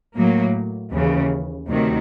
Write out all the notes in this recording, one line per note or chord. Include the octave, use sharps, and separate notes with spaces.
A2 F#3 A#3
D#2 C#3 E3
D2 C3 D#3 F#3